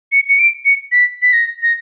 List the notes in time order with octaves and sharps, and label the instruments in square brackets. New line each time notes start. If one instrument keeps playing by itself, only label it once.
[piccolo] C#7
C#7
D7
C#7
B6
B6
A#6
A#6